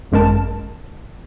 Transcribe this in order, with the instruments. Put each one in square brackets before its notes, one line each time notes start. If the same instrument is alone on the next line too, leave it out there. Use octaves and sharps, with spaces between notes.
[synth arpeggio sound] G#1 F#2 G#3 A#4 A5